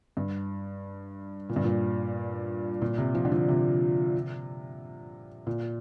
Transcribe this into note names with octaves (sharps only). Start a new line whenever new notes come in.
G2
A#2
G2
A#2
A#2
C3
F3
D3
F3
C3
A#2